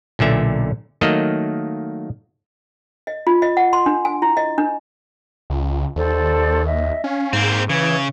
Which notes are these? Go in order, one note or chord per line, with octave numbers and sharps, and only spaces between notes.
B1 A#2 D3 E5
D#3 F#3 A3 A#3 D#5
D#5
F4
D#5
F#5
C6
D4
G#5
E4
D#5
D4
C#2
D#2 A4 C5 D5
D#5 E5
C#4 F5
G#2 A#3 C4
C#3 E3 G#6